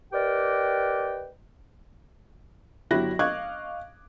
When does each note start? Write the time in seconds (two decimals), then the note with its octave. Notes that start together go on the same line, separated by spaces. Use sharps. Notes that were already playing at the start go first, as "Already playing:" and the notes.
0.13 G4 A#4 B4 D5 D#5 G5
2.91 G1 F#3 E4 G4 F#6 A#6
3.19 D#5 F5 C#6 D6 F#6 G#6